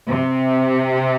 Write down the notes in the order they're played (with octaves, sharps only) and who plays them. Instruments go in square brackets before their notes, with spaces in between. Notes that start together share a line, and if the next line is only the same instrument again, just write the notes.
[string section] C3